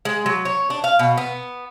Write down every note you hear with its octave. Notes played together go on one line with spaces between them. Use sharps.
G#3
F#3
C#5
D4
F5
B2
B3